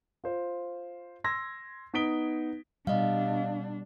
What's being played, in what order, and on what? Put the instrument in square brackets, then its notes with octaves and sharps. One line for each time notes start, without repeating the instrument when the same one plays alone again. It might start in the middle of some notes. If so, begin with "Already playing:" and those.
[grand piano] F4 C5
C6 E6 G#6 A#6
B3 D#4 D#6 B6 D7 G7
[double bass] B2 [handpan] G3 [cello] D4 [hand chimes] D#5 F5